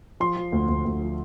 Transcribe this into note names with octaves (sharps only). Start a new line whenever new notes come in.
F3 C6
F3
D2
D2
D2
F3